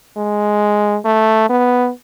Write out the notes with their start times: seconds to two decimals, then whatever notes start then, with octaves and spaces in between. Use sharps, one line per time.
0.16 G#3
1.05 A3
1.49 B3